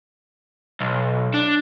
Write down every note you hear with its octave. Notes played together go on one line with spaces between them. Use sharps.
B1
D4